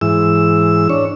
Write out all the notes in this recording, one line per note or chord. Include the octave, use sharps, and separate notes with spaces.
G#2 E3 E6
D4 C#5